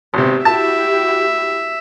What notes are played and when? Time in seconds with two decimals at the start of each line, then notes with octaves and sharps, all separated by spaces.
0.14 G#1 C3 B3 G4
0.45 E4 F#4 G4 E5 A5